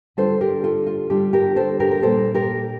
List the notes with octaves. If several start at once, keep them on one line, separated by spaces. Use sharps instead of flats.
D3 G3 D4 F4 A4 C5
G4 A#4
F4 A4
F4
D3 G3 D4 F4 G4
G4 A#4
A4 C5
G4 A#4
A#4
A#2 G3 A#3 A4 C5
G4 A#4